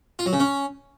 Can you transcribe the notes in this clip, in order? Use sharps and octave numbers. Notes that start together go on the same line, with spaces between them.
F4
F#3
C#3
C#4